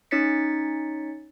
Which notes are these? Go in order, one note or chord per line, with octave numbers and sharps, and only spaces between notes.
C#4 D#4 C#5 A6 B6 C#7